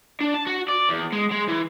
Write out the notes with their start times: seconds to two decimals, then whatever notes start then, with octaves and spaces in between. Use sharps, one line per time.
0.20 D4
0.34 A5
0.47 F#4
0.68 D5
0.89 E2
1.12 G#3
1.31 G#3
1.48 E3